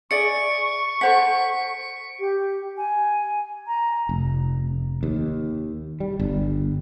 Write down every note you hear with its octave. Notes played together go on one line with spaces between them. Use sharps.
G#4 D5 E5 C#6 C#7 D7
A4 C5 F#5 B6
G4
G#5
A#5
F1
D#2
G3
G1